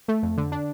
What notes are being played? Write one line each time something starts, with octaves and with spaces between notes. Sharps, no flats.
A3
F2
D3
D4